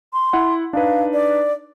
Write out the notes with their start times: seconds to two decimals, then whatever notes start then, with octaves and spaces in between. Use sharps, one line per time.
0.13 C6
0.33 E4 F#5
0.73 D4 D#4 B4 F5
1.13 D5